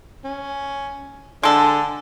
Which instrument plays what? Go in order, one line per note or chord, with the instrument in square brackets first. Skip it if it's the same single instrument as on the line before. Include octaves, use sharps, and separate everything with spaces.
[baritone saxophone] C#4
[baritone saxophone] D3 [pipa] G#3 A4